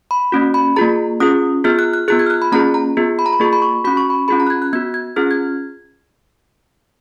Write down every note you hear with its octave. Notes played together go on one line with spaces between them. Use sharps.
B5
A#3 C#4 F#4
B5
A#3 F4 G#4 A#5
C#4 F4 G#4 D#6
B3 F4 G#4 F6
F#6
F#6
B3 F4 G#4 F#6
G#6
F6
F#6
B5
A#3 C#4 F4 G#4 A#5
A#5
B3 F4 G#4
B5
A#5
B5
A#3 F4 G#4 C#6
B5
C#6
C#4 F#4 B5
C#6
B5
C#4 F4 G#4 B5
A#5
F#6
G#6
F#6
B3 F#4 G#6
G#6
C#4 F4 G#4 F6
G#6